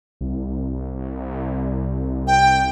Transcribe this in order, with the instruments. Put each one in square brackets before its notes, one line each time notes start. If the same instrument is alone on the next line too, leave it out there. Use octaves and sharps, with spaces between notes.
[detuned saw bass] C2
[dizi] G5